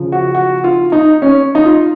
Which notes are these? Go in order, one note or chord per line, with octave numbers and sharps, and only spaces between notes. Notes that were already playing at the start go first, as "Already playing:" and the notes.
Already playing: C#3 F3
F#4
F#4
F4
D#4
C#4
D#4
F4